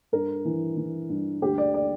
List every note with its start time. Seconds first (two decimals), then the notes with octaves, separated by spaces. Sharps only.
0.12 G2 A#4
0.45 E3
0.77 E3
1.09 G2
1.42 D2 G4
1.58 D5
1.74 D5